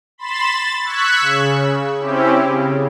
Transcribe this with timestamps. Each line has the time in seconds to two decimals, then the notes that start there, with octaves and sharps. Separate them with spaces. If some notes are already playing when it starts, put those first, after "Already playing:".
0.18 B5 C6 A6 E7
0.51 A6
0.85 C#6 E6 F#6 G#6 B6
1.20 C#3
1.99 C4 C#4 E4 G4
2.47 C#3